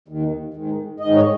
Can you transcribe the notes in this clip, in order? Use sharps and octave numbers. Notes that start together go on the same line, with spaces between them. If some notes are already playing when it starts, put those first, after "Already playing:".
D#2 D#3
G#2 D#3
G#2 D#3 D#5
C#5